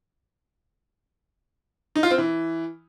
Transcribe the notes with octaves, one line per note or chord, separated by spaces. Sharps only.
D#4
F4
C4
E3